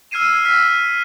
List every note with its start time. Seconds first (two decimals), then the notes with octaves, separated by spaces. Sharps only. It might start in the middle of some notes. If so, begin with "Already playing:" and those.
0.11 E6 F6 G#6 C7 D#7 E7
0.45 E6 F6 B6